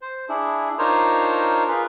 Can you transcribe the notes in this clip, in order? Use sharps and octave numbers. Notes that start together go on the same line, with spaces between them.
C5
D4 E4 G#4
D4 D#4 F4 A#4 C5 C#5
F4 G#4 A#4 B4